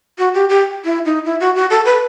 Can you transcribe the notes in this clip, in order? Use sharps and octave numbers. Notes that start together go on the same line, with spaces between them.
F#4
G4
G4
E4
D#4
E4
F#4
F#4
A4
B4